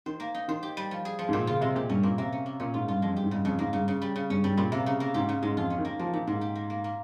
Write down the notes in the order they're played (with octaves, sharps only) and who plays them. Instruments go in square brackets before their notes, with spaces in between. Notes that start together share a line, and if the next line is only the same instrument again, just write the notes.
[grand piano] D#3 [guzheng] C5
[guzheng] A#3
D#4
[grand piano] D#3 [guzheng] C5
[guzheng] G4
G3
F3
G#4
F3
[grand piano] G#2
[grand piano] A#2 [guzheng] C5
[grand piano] C#3 [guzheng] F4
[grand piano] C3 [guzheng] G#3
[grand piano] A#2 [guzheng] G4
[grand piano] G2 [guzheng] C#4
[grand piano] A#2 [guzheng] A#3
[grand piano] C3 [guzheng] A#3
[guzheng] C#4
A#3
[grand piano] A#2 [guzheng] C#4
[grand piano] G#2 [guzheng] F4
[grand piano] G2 [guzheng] F4
[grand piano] F2 [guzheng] G#3
[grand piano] G2 [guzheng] G4
[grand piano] G#2
[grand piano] G2 [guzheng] C#3
[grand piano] F2 [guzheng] C#3
[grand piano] G#2 [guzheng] A#3
[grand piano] G2 [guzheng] C#3
[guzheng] C#3
G3
C#3
[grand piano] G2 [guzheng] C#4
[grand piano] G2 [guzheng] G3
[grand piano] A#2 [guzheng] G3
[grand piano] C3 [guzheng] A#3
[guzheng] C#3
A#3
[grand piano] G#2 [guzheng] G4
[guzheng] C#3
[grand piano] G#2 [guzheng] G#3
[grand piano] F2 [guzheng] F4
[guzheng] C#4
[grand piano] D#3
[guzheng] A#3
[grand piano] F3 [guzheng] A#3
[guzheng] A#2 [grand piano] D#3
[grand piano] G#2 [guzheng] A#3
[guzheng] G4
A#3
A#3
A#3